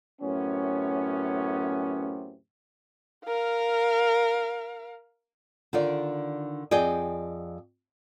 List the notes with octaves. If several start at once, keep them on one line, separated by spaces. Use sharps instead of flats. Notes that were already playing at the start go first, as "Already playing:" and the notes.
F#2 A2 C3 B3 C#4
A#4 F5
D3 D#3 F4 D5
F2 G#4 D5 D#5 G5